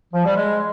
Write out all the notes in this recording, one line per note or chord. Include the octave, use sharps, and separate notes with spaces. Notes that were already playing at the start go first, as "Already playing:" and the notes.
F3
G3
G#3